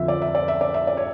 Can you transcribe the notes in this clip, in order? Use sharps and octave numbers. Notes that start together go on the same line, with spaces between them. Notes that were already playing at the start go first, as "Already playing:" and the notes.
Already playing: F2 D3 F3 E5
D5
E5
D5
E5
D5
E5
D5
C#5